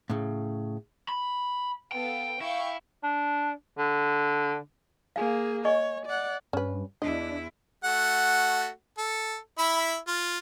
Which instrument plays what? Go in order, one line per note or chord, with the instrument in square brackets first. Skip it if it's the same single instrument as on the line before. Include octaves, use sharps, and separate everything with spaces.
[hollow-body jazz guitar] A2 C#3
[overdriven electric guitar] B5
[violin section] B3 A4 F5 [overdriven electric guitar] G5
[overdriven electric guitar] E4 [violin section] F5 G5 C#6
[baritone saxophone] D4
D3
[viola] A#3 G#4 [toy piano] F5 G#5
[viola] C#5 [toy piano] D#5 G#5 C#6
[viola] D5 F#5
[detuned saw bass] G2 [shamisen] C#4 B4
[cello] E2 E4 [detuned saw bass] D4 [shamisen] D#5
[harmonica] A3 F#4 F#5
A4
E4 E5 B5
F4